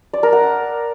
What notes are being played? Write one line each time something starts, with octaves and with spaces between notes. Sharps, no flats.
D5
A#4
F#5